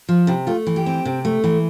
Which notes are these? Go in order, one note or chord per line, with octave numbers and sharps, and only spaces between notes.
F3
C3 E4
A3 F4
E3
G4
C4
C3
A3
E3